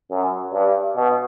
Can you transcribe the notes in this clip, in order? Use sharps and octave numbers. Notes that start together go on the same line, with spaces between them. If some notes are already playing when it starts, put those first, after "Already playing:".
F#2
G2
B2